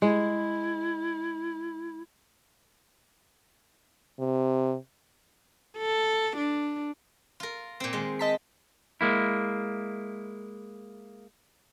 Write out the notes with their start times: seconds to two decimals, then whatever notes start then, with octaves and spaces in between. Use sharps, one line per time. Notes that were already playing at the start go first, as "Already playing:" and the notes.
0.02 G#3 E4
4.19 C3
5.78 A4
6.37 D4
7.40 F4 A#4
7.80 A#2 C4
7.93 D#3 G#3
8.19 D#5 A5 B6
9.01 G#3 A#3 E4